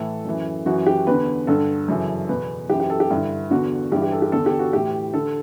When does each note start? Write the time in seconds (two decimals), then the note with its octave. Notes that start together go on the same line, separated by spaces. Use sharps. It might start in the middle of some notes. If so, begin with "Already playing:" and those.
Already playing: A2 E3 A4
0.25 F#2 E3
0.66 F#2 E3 F#4
0.86 G4
1.07 E2 D3 B4
1.47 G2 D3 A4
1.88 F#2 C#3 E3
2.29 E2 B2 B4
2.70 F#2 E3 G4
2.80 G4
2.90 A4
3.00 G4
3.10 G2 D3 E4
3.50 E2 D3 F#4
3.92 G2 G4
3.96 E3
4.02 G4
4.12 A4
4.22 G4
4.32 E2 D3 A4
4.46 G4
4.59 F#4
4.73 A2 E3 G4
5.14 D3 A4